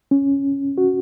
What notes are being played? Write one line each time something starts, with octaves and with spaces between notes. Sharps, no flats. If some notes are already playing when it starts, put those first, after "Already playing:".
C#4
F#4